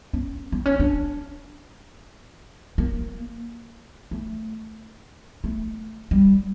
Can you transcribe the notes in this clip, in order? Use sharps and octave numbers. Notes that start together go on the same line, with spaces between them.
C#4
C4
C#4
D4
A#3
A3
A3
G3